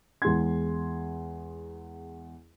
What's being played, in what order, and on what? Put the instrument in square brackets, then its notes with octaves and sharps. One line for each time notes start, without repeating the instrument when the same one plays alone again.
[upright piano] E2 G#3 C6 G#6